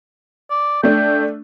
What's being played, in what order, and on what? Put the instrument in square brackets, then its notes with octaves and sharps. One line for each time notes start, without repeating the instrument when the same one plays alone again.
[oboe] D5
[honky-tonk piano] A3 D4 [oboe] G5